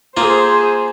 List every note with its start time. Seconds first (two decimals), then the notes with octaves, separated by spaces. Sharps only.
0.17 A#3 F4 G#4 C5